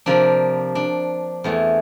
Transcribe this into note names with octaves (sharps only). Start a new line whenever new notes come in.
C3 F3 A#3 D4
D4
E2 E3 A3